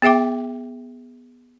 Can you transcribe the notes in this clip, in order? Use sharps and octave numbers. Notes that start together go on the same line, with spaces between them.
B3 G#4 E5 G5 D6